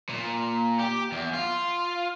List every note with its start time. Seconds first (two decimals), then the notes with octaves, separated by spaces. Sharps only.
0.09 A#2
0.79 G4
1.12 E2
1.34 F4